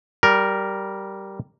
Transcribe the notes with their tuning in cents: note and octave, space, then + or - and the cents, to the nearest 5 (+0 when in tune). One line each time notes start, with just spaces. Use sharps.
G3 -10 A#4 +0